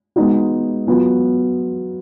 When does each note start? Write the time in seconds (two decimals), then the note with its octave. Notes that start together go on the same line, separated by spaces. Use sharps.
0.16 G#3 B3 D#4 F#4
0.87 F#3 B3 F4